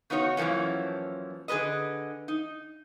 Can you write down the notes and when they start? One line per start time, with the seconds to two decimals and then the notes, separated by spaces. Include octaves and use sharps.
0.10 C#3 B3 D#4 F#4 C#5
0.37 F#2 E3 F3 A#3 C#4
1.48 D3 G#4 A4 B4 D#5
2.28 D#4